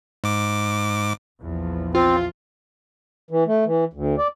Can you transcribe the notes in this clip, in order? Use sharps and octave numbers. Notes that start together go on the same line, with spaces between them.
G#2 D6
A#1 E2 F3
C4 F4
E3
A3
E3
D2
D5